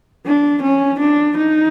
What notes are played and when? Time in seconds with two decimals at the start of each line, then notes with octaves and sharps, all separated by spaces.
0.26 D4
0.62 C#4
1.00 D4
1.37 D#4